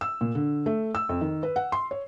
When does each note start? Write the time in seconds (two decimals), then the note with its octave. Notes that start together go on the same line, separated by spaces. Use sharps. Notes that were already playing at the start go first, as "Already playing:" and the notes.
0.01 E6
0.21 A#2
0.35 D3
0.66 A3
0.95 E6
1.09 F2
1.21 D#3
1.43 B4
1.56 F#5
1.72 C6
1.91 C#5